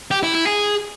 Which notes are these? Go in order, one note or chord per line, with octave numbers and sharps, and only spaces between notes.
G4
E4
E4
G#4